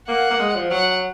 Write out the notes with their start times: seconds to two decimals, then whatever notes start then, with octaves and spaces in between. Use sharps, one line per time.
0.08 A#3 F#5
0.30 A#3
0.39 G#3
0.55 F3
0.70 F#3 F#5